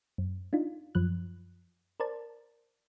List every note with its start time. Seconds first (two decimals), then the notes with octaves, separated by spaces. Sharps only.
0.18 F#2
0.53 D4 D#4 F4
0.95 F#2 F3 F#6
2.00 A#4 C5 D5 A5